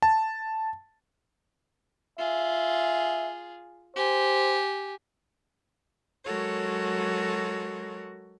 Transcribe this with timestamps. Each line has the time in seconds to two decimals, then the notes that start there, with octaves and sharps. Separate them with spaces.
0.02 A5
2.19 F4 G#4 E5
3.96 G4 C5 G#5
6.25 F#3 G#3 F#4 A4 A#4 C#5